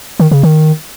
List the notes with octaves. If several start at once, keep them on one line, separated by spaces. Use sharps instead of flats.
D#3
C#3
D#3